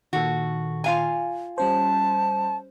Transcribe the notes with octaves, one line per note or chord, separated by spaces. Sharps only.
A#2 D#3 F#4 A4
F4 F5 G#5
G3 C#4 C5 A5